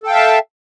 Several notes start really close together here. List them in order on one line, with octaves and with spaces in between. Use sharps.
A4 G5 F5 E5 A5